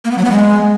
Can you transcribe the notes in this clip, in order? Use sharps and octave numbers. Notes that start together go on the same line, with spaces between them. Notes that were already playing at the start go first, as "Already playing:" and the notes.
A#3
B3
F#3
B3
G#3